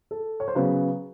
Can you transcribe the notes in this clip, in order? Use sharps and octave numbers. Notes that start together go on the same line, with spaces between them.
A4
C#5
C5
C#3 F#3 B3 B4